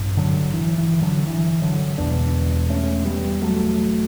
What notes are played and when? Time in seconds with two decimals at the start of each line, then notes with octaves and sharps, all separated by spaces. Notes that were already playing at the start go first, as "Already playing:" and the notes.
Already playing: A1 G2
0.17 D3 F#3
0.54 E3
0.78 E3
1.01 D3 F#3
1.26 E3
1.62 D3 F#3
1.98 E1 E2 B2 B3 D4
2.70 A3 C#4
3.05 G3 B3
3.42 F#3 A3